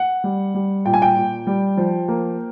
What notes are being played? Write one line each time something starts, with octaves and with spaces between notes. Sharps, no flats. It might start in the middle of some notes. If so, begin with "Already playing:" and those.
Already playing: F#5
G3
G3
A#2 G5
G#5
G5
A#2
G3
F3
A#3